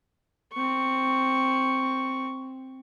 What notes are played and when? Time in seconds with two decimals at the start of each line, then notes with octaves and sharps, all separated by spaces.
0.53 C4 C#6